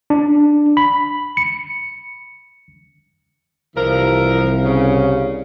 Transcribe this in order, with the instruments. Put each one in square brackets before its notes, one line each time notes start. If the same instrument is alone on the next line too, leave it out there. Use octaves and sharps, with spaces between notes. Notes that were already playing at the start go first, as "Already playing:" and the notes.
[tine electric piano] D4
B5
C#7
[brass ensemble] C2 [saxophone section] E3 F3 A#4
[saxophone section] C#3